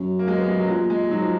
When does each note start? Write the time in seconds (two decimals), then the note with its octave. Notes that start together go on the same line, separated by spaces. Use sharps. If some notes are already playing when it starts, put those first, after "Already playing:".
Already playing: F#2
0.19 A#3
0.28 G#3
0.38 B3
0.49 G#3
0.59 F#3
0.69 A#2 G#3
0.90 G#3
1.11 G#2 F#3
1.21 F3